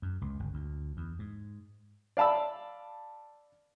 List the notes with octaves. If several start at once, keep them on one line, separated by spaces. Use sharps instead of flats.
F#2
C#2
G1
D2
E2
G#2
D5 F5 A5 B5 E6